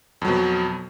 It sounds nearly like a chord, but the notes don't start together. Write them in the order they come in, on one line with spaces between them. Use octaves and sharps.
F2 F#3 B2